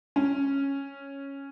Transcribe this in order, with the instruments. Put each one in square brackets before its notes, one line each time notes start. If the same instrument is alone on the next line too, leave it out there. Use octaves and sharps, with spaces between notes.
[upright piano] C#4